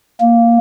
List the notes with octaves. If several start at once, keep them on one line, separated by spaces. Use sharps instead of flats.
A#3